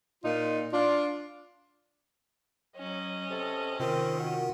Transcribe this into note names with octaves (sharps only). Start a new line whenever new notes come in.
A#2 D#4 F4
D4 F4
F#3 C#4 D#5
C3 A4
C3 D#3 C4 F4 A#4
F#4